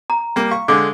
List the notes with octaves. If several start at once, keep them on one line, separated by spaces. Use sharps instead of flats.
A#5
G3 A#3
F5 C#6
D3 G#3 D6